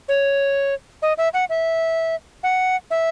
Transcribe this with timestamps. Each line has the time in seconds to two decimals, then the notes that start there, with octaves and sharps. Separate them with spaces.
0.08 C#5
1.02 D#5
1.18 E5
1.34 F#5
1.49 E5
2.43 F#5
2.91 E5